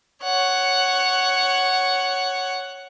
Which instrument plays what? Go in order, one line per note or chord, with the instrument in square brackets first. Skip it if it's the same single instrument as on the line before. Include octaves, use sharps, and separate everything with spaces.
[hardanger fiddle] C#5 F#5